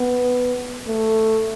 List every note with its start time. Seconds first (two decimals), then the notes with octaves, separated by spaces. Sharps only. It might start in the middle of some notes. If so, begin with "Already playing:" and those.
Already playing: B3
0.88 A3